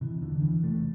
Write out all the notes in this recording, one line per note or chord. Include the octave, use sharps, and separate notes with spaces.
C3 E3
E2 D3
E2 E3
C3 A3